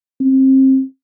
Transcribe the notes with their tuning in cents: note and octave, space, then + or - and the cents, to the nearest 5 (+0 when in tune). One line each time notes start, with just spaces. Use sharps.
C4 +25